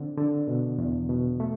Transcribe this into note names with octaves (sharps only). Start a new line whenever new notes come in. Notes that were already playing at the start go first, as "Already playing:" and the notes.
Already playing: D3 C4
D3
B2
E2
B2
A3